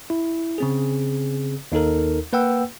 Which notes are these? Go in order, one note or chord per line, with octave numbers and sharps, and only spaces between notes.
E4
C#3 C4 G#4
D#2 D#4 A4 A#4
A#3 B4 F#5 G5 E6